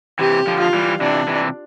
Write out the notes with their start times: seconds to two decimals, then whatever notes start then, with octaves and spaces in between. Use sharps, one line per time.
0.19 C3 E3 G4
0.47 D3 F3
0.60 F4
0.74 E3 G3
1.01 C3 E3 D4
1.28 C3 E3